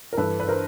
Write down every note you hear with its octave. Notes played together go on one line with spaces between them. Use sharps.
A#4
G2 E3 A4 B4
B4
A#4 C5